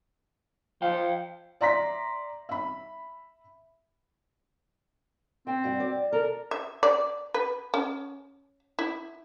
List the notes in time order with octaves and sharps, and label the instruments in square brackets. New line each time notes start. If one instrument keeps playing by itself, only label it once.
[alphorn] F3 [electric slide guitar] F5 G5
[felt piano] D5 E5 A#5 C6 A#6 B6
E5 B5
[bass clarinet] C4 [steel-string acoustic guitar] G5
[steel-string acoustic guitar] G2 F#4
D5
[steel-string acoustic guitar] A4 [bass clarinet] A#4
[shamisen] E5
D5
B4
C#4
E4